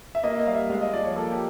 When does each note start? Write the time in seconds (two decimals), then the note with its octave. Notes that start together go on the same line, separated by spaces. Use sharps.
0.15 E5
0.24 A#3 D#5
0.39 D#5
0.47 G3 F5
0.54 E5
0.70 G#3 F5
0.81 D#5
0.93 F3 D5
1.04 C#5
1.16 A#3 A4
1.32 G4